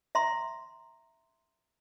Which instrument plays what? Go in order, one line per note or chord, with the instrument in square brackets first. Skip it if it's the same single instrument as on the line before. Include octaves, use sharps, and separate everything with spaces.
[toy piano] E5 A#5 C6